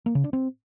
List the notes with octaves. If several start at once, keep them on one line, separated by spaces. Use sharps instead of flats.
A#3
C#3
D4
C4